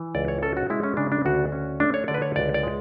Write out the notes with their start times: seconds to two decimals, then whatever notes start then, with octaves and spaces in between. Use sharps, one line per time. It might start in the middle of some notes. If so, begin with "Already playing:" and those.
Already playing: E3
0.15 C#2 D5
0.28 C#5
0.42 C#4 A4
0.57 F#4
0.70 G#3 E4
0.83 C#4
0.97 C#3 D4
1.12 D4
1.25 D2 F#4
1.52 C#4
1.80 A3 D4
1.94 C#5
2.08 D3 D5
2.14 B4
2.22 C#5
2.36 C#2 D5
2.54 D5
2.63 G#3